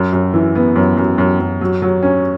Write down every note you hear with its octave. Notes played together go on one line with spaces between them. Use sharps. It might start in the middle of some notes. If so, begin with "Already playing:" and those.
Already playing: F#2
F#2
E3
B3
F#2
F#2
F#2
F#2
F#3
F#3
C#4